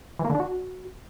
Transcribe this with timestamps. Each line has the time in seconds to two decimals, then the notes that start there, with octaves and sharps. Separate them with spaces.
0.19 E3
0.24 A#3
0.30 D3
0.35 D4
0.40 F#4